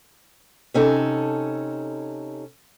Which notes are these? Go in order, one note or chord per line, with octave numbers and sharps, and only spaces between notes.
C3 C#4 D#4 A4